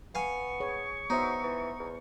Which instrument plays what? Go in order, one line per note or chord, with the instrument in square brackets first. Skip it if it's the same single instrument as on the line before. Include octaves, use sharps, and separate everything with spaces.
[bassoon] B3 [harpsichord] F5 G#5 [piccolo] C#6
[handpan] G#4 C#5
[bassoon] F#3 [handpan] B3 C5 E5 [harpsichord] D#4
[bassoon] E3
E2